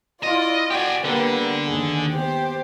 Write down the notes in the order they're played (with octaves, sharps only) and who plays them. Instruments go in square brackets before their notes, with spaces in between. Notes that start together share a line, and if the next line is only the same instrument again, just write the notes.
[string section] E4 F4 D5 [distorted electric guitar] D#5
[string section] F#4 D5 [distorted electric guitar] G4 G#5
[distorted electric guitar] D3 [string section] G3 A#3 B3
[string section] D#2 G#4
B3 G4 C5